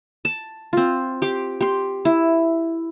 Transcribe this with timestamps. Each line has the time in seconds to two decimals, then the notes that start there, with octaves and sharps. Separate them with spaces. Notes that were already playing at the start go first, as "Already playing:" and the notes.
0.25 A5
0.73 C4 F4
1.22 G4 C6 D6
1.61 G4 C6
2.05 E4